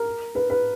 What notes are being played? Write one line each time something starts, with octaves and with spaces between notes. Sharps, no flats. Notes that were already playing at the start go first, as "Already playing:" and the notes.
Already playing: A#4
B4
B4